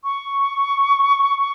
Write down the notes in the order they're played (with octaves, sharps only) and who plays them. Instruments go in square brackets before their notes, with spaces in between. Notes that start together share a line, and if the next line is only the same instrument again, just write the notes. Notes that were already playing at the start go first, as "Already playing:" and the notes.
[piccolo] C#6